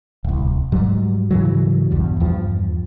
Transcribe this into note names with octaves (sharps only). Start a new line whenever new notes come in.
D1 C2
G#2 F#3 G3
G#2 C#3 E3 F#3
A#1 E2 G2 G3
E2 G2 F3